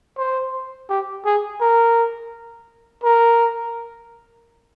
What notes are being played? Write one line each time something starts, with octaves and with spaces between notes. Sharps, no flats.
C5
G4
G#4
A#4
A#4